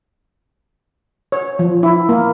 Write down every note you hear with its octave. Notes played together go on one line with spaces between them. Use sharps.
C#5
F3
E4
A#3